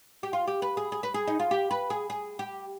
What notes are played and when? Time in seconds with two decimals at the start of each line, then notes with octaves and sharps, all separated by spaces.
0.23 G4
0.33 F4
0.47 G4
0.62 B4
0.77 G#4
0.92 G#4
1.03 B4
1.14 G#4
1.27 D#4
1.39 F4
1.51 G4
1.71 B4
1.90 G#4
2.10 G#4
2.39 G4